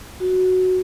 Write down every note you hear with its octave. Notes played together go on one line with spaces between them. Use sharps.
F#4